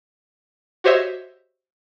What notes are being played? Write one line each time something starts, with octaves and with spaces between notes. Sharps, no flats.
F#4 G4 C5 C#5 D#5 E5